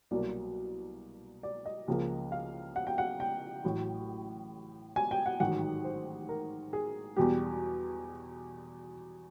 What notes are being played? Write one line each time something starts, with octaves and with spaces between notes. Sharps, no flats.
C2 B2 F#3 A#3 D5
D5
D#5
C#2 C#3 F3 A#3
F5
F#5
G5
F#5
G5
A1 A2 F#3
G#5
G5
F#5
A1 G#2 D#3 F#3 F#5
C5
A#4
G#4
E2 B2 G3 G4